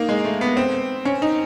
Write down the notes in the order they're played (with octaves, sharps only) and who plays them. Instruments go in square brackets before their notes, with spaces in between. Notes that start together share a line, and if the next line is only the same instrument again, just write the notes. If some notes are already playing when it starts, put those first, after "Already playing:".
Already playing: [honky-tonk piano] A#3 D#4
G#3
A3
B3
C4
C#4
D#4